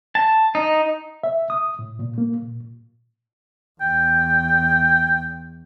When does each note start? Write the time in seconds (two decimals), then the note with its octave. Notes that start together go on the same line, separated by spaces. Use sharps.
0.15 A5
0.55 D#4
1.23 E5
1.50 D#6
1.79 A2
1.99 A#2
2.18 A#3
2.42 A#2
3.81 E2 G5